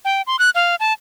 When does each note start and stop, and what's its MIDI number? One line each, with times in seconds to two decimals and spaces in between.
0.05 0.22 79
0.27 0.36 84
0.39 0.50 90
0.55 0.75 77
0.80 0.93 81